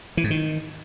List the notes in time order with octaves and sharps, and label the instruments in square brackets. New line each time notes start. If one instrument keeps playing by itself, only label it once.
[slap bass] E3
G#2
D#3